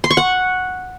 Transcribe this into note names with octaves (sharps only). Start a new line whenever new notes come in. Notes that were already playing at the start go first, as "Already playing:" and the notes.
C6
C#6
F#5